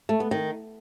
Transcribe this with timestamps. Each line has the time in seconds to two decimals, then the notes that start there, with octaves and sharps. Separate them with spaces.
0.09 A3
0.20 B3
0.31 D#3